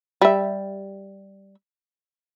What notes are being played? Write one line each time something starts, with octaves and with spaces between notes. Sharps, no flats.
G3 E5